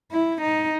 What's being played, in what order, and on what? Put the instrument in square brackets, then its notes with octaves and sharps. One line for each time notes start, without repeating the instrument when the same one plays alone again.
[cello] E4
D#4